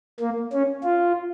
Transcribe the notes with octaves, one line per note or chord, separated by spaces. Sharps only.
A#3
C#4
F4